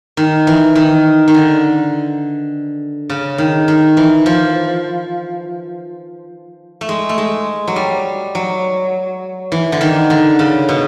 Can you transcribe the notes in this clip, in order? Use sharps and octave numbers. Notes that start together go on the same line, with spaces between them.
D#3
E3
D#3
D#3
D3
C#3
D#3
D#3
E3
F3
A3
G#3
A3
G#3
F#3
G3
F#3
E3
D3
D#3
D3
C#3
B2